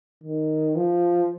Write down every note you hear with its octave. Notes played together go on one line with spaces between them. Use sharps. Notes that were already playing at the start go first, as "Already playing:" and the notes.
D#3
F3